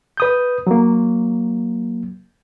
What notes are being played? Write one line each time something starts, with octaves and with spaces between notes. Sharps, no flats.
B4 D#6 G6
F#3 A#3